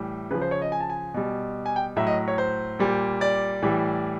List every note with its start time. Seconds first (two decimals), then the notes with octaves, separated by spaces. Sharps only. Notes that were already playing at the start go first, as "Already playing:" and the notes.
Already playing: A2 E3 G3
0.30 C#3 B4
0.35 F3
0.42 C5
0.51 C#5
0.62 D#5
0.72 G#5
0.80 A5
0.90 G#5
1.14 B2 G3
1.66 G#5
1.76 G5
1.96 A2 F#3 E5
2.07 D#5
2.28 C#5
2.38 C5
2.79 A#2 G3
3.21 D5
3.62 A2 E3 G3